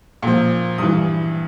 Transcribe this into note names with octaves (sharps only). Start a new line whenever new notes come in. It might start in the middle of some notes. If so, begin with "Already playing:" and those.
A#2 F3
G2 E3 D#6